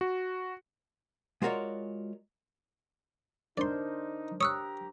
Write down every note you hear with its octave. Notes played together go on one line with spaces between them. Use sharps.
F#4
G#3 F4 F#4 A#4 C#5 D5
D4 D#4 A#4 C5 D5 C6
G4 C#5 A#5 D#6 E6 F#6